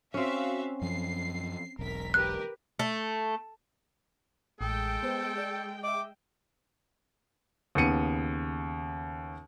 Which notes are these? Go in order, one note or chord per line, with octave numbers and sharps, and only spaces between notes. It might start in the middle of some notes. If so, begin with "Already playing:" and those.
C4 C#4 F#4 E5 F5
F#2 F3 C7
E1 B1 A#4 B6
G4 A#4 B4 F#6
A3
A1 G#3 A4 G5 D#6
B3 C5
D5 E6 G6
D#5 E5 D6
D#2 C#3 B3 C#7 D#7